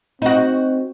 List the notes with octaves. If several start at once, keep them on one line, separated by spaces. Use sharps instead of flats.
C4 D#4 F#4